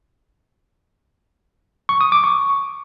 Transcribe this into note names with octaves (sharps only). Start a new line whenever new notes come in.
C#6
D#6
D6
C#6